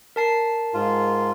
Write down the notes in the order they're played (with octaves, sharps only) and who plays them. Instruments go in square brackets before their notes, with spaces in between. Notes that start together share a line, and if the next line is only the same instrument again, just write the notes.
[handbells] A#4 A5 C7
[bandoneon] G#2 F4